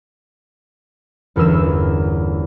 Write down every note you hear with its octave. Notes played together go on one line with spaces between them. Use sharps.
G1 E2 C#4 A#4 E6 E7